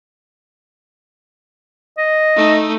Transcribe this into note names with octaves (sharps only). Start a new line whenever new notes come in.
D#5
A3 D#4